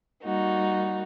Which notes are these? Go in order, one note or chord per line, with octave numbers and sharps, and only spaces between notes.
G3 A#3 D#4 F#4